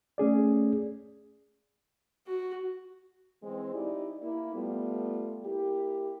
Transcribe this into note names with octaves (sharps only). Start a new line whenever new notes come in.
A3 C#4 G#4 D5
F#4
E3 G#3 C4
D#4 E4 G4 D5
A#3 E4
G3 A3 B3 F4
A#3 E4 G4